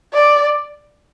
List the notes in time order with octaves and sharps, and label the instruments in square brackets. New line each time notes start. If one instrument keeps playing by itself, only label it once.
[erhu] D5